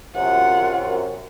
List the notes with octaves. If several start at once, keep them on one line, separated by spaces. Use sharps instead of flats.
F#2 C3 F4 F#5